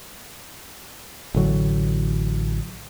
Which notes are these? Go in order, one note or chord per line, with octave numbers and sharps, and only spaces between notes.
A1 D3 F#3